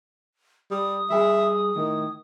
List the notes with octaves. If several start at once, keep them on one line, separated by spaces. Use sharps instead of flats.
G3 D#6
G3 G#4 E5
A2 D#3